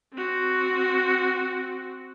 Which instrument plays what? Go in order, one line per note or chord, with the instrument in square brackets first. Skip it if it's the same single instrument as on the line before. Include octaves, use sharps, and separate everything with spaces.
[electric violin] C4 F#4